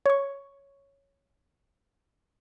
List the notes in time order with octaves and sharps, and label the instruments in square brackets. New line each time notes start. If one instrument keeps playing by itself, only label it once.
[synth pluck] C#5 C#6